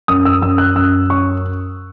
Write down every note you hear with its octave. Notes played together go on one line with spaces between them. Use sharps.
F#2 D#6
E6
F#2 E6
F#6
F#2 E6
C#4 C#6